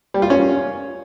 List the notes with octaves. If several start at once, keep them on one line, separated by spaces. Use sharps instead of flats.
G3
F4
C#4